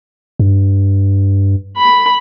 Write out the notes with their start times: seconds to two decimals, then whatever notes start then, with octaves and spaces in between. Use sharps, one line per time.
0.39 G2
1.77 B5